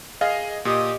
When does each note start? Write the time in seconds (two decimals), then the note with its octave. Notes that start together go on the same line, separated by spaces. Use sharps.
0.21 G#4 D#5 F5
0.65 A#2 G4 D#5